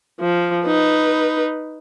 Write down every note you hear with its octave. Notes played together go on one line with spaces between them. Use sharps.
F3
D#4 B4